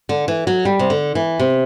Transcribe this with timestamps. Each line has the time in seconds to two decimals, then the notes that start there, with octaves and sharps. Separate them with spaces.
0.09 D3
0.28 E3
0.47 F#3
0.65 G3
0.79 C3
0.90 D3
1.15 E3
1.39 C3